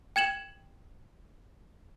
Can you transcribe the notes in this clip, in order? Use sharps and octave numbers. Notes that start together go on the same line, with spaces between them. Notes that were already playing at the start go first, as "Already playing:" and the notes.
G5 G#6 E7 F#7